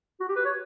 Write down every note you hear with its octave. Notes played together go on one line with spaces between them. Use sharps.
F#4
G4
B4
C#5